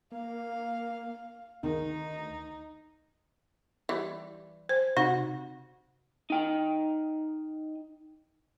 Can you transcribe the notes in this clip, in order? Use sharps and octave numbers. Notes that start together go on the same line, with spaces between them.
A#3 F5
D2 D#3 D#4
E3 G3
C5
C3 D#4 F#4
D#4 G5